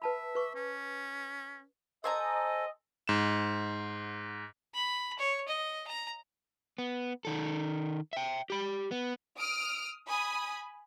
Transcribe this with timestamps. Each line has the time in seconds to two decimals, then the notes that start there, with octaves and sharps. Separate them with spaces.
0.02 B4 E5 A5 B5
0.35 B4 C#6 D6
0.55 C#4
2.04 A4 C5 D#5 G#5 A#5
3.08 G#2 E7
4.74 B5
5.19 C#5
5.48 D#5
5.87 A#5
6.78 B3
7.25 D#3 A4
8.13 E5 G5
8.50 G4 B5
8.91 B3
9.37 D#6 F6 D7
10.08 G#5 B5 D#6